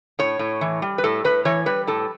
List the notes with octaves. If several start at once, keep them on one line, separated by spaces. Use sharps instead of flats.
A2 C#5
A2
E3
G3
B4
A2 A4
A2 B4
E3 C#5
G3 B4
A2 A4